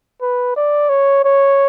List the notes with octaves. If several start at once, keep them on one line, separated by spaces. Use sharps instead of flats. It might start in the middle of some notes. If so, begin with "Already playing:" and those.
B4
D5
C#5
C#5